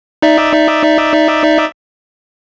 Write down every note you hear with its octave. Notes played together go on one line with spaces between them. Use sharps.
D#4 D5 E5